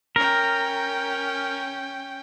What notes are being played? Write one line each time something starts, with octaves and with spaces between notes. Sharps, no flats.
C#4 A#4 G5